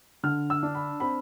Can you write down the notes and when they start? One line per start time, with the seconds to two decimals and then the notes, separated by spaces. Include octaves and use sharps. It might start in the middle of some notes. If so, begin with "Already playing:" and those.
0.23 D3 F6
0.50 E6
0.63 D4
0.75 B5
1.00 C4 B5